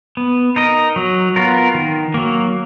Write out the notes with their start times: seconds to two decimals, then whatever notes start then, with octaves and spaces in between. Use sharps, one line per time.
0.17 B3
0.56 D#4 A#4 D#5
0.96 F#3
1.36 B3 F4 A#4
1.74 D#3
2.14 F#3 A#3